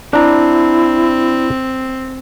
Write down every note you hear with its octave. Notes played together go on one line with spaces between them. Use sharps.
C4 D4 E4 A#5